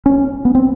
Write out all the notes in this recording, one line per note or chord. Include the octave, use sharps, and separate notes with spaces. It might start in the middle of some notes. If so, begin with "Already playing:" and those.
C#4
B3
C4